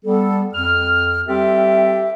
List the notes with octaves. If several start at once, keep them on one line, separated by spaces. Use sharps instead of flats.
G3 B3 A4
F2 F6
G3 C4 G4 A4 E5